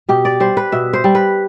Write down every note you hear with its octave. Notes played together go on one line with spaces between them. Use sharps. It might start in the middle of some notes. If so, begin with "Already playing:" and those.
B2 G4
D5
G3 C5
B4
B2 E5
C5
G3
B4